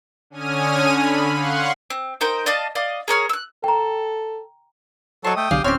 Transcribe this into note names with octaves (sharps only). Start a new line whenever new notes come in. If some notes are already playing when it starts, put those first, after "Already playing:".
D3 C#4 G#5 D#6 F6 D#7
D3 B5
F5 F#5 C6 C#6 F#6
C4
D#4 A#4 C5 G5
D5 D#5 F5 A5
D5 D#5 F5
G#4 A#4 C#5 F6
E6 F#6
A4 G5 A#5
F#3 A4 C5 D#5 A5 C#6
A3 G5 D#6
B1 D3 F#3 G4 G#4 F5
D1 C4 C#4 G4 C#5 F6